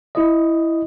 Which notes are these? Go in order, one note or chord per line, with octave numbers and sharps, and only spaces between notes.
E4 D#5